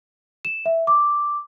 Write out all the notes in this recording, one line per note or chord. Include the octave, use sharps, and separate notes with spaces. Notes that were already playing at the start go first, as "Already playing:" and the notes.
E7
E5
D6